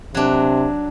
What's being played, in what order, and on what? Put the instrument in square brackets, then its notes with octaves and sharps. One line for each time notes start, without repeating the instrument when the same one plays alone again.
[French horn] C3 [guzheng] F#3 D4